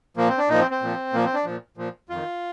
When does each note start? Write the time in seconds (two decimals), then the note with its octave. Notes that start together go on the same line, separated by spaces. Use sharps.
0.17 A#2 F3 A#3
0.28 C4
0.38 D4
0.49 A#2 F3 D#4
0.60 C4
0.71 C4
0.82 A#2 F3
1.13 A#2 F3 A#3
1.24 C4
1.34 D4
1.45 A#2 F3
1.77 A#2 F3
2.09 F2 D#3 F4